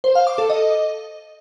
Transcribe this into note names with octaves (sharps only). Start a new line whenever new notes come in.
C5
F5
D6
A4
D#5